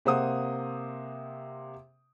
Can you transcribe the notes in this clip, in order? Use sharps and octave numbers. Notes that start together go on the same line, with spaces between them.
C3 A#3 C5 F#5 D#6